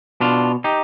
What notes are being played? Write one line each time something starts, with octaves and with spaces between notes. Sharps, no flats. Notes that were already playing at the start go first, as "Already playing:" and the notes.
B2 D4 F4
D#4 G4